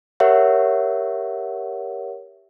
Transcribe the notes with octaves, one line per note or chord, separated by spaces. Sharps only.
G4 A#4 C#5 E5 F#5